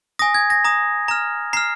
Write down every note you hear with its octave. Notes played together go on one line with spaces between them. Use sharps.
G#5 D#6 A#6
G#6
A#6
A#5 D#6
A#5 F6
A#5 F6 C7